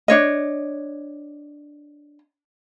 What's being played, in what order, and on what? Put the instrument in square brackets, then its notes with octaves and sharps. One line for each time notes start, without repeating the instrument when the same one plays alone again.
[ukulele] D4 C#5 D#5